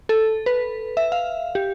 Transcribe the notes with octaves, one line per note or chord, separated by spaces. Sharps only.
A4
B4
E5
F5
G4